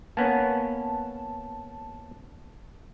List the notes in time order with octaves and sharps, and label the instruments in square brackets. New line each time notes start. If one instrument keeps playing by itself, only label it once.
[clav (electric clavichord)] A#3 B3 C#4 [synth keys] A5